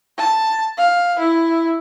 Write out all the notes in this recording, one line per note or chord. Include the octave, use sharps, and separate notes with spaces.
A5
F5
E4